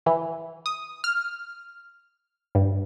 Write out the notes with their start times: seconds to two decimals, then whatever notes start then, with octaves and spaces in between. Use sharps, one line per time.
0.06 E3
0.66 D#6
1.04 F6
2.55 G2